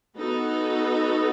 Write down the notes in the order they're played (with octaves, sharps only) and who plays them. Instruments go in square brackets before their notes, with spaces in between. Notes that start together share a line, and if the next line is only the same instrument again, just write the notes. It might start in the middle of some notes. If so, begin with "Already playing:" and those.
[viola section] B3 D#4 F#4 A4